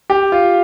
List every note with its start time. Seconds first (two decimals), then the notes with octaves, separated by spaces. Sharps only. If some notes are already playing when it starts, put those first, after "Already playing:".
0.10 G4
0.32 F4